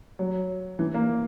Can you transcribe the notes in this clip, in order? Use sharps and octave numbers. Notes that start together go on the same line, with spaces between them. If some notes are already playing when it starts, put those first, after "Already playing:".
F#3
E3
A#3